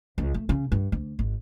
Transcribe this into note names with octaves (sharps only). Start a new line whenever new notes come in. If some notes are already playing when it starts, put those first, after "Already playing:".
C#2
A3
C#3
G2
D2
G#1